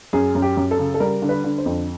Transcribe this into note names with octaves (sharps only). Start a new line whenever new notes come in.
F#2 G#4
F#2
G4
F#2
A4
C#3
A4
G3 A#4
D3
B4
D3
C5
F2